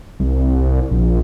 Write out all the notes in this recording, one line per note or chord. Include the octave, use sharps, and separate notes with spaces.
C2
A#1